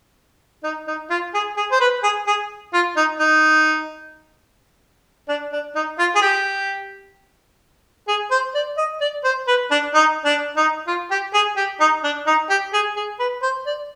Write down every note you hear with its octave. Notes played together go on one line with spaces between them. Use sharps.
D#4
D#4
F4
G#4
G#4
C5
B4
G#4
G#4
F4
D#4
D#4
D4
D4
D#4
F4
G#4
G4
G#4
C5
D5
D#5
D5
C5
B4
D4
D#4
D4
D#4
F4
G4
G#4
G4
D#4
D4
D#4
G4
G#4
G#4
B4
C5
D5